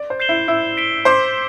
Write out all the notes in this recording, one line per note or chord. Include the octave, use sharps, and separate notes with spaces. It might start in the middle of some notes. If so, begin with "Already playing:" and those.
Already playing: D5
C5
G6 C7 E7 G7
E4 E5
E4 E5 E6
B6 D7 G7
C5 C6 D6